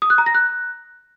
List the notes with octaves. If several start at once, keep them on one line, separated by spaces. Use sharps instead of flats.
D#6
F#6
A#5
A#6
F#6